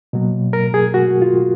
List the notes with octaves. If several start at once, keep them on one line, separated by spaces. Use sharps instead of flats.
B2 F#3 A#3
A#4
G#4
F#4
F4